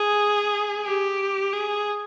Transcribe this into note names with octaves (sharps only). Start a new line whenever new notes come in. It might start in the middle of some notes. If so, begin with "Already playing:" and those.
Already playing: G#4
G4
G#4